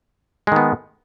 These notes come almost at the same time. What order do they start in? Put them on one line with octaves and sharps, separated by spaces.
G#3 D#3 B3